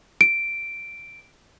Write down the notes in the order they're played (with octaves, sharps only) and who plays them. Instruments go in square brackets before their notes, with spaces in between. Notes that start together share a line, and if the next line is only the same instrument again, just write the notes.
[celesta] D7